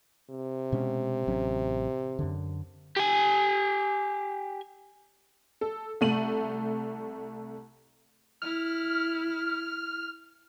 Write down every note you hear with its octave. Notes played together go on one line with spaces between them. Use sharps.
C3
B2 G#3 C#4
A1 F#3 C#4
F#2 D3
G4 G#5
A4
C2 A3 D#7 F#7
E4 F6